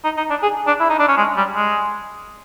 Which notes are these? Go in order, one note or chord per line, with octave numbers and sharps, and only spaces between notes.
D#4
D#4
D4
G#4
D4
E4
D#4
D4
C#4
G#3
G3
G#3